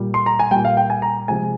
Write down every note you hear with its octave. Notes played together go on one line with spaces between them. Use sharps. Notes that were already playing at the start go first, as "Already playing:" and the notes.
Already playing: A#2 G3
C6
A#5
G#5
A#2 G3 G5
F5
G5
G#5
A#5
C3 F3 G#3 G#5